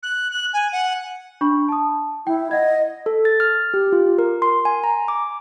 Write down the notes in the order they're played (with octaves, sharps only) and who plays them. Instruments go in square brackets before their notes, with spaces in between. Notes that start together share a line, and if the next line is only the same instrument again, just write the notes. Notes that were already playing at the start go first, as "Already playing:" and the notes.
[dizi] F#6
F#6
G#5
F#5
[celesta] D4 B5 C#6
A5 D#6
[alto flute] E4 [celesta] G5
[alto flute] D#5 [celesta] F#5 G#6
[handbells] A4
A6
F6
G4
F4
A#4
C6
G#5
A#5
D6